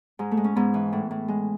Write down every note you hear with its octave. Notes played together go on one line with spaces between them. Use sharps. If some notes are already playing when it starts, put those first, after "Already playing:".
G#2 G#3
A3
G#3
C#4
G#2 B3
E3
A2
A2
G#3